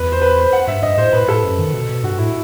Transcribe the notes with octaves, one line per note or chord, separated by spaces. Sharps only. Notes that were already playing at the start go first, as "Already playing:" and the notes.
Already playing: E2 B4
C5
B4
C5
F#5
G2 E5
G2 D#5
A2 C5
A2 B4
A2 A4
F#2
D#3
B2
B2
G2 F#4
A2 E4